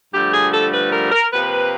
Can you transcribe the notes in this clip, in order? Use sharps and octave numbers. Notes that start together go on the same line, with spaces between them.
G2 D3 F3 A3 G4
G#4
A4
B4
A#4
A#4
C3 F3 A#3 B4